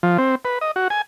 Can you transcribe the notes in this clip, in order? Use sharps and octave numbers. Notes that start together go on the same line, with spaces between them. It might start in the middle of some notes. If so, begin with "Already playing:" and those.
F3
C4
B4
D#5
F#4
G#5